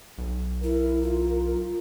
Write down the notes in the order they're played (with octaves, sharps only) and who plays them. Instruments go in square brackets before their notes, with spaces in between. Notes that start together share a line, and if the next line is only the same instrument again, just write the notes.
[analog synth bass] B1
[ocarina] E4 [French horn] A#4
[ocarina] F4